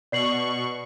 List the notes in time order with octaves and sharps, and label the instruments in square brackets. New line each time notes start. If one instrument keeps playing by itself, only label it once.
[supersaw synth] B2 C#6 [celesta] D5 C7 F#7